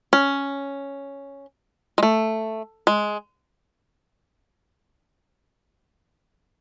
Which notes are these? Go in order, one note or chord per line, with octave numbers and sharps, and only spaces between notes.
C#4
G#3
A3
G#3